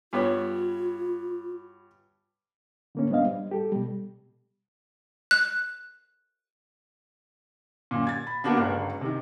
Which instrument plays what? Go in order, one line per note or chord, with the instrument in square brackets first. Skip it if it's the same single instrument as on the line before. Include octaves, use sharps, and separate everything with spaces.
[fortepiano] G2 B3 C#5 [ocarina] F4
[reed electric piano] D3 A#3 C#4
G3 B3 D4 C5 D#5 F5
G3
G4 A4
B2 G3
[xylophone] F#6
[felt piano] F#2 A#2
G#6 A6
B5
A#3 B3 D4 F#4 A#4
G1 C#2 F#4
C3 D#3